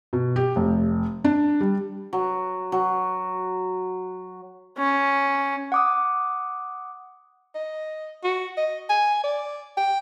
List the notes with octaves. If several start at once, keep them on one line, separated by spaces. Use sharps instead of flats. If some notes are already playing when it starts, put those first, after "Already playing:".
B2
G4
F1
D4
G3
F#3
F#3
C#4
F#5 D6 D#6
D#5
F#4
D#5
G#5
D5
G5